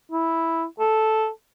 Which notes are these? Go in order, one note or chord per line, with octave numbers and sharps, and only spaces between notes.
E4
A4